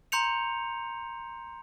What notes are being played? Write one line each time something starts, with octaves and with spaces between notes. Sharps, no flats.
A#5 C6 G6 C#7 F7